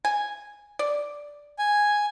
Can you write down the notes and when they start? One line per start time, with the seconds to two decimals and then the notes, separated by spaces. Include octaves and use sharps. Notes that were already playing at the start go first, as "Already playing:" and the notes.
0.05 G#5
0.79 D5
1.59 G#5